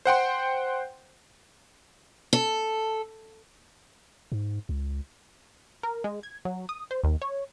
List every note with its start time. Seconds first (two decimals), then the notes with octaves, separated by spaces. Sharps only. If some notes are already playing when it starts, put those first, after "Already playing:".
0.05 C5 F#5 G5 C6
2.33 A4
4.32 G#2
4.69 C#2
5.83 A#4
6.04 G#3
6.23 G#6
6.45 F#3
6.69 D#6
6.91 C5
7.04 D#2
7.22 C#5